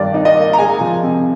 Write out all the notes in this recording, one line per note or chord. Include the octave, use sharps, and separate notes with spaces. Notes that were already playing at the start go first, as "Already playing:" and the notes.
Already playing: G2 D#3 D5
D#4
D#5
A#3
A#5
G#3 G#5
F3
C3